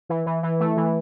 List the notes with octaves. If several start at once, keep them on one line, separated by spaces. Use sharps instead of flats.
E3
E3
E3
A3
E3